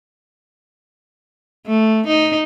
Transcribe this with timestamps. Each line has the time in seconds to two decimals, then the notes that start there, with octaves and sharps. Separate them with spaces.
1.66 A3
2.07 D#4